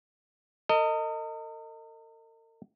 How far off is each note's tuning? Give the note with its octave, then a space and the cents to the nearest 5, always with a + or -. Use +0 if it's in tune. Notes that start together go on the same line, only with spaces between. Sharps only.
A#4 -45 D#5 +0